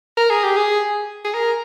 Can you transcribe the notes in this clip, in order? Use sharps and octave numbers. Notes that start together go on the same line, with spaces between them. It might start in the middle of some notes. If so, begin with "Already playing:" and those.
A#4
G#4
G4
G#4
G#4
A#4